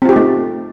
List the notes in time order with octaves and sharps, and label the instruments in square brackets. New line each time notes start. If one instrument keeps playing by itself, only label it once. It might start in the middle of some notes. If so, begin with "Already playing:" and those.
[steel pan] C4
F4
G4
D#4
A3